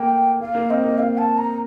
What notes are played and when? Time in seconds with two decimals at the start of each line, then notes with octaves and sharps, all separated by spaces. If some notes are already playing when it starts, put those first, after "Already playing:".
Already playing: A3 A#3 G5
0.40 A#3 F5
0.55 A#3
0.70 C4 D#5
0.84 A#3
0.98 A#3 F5
1.18 A5
1.38 A#5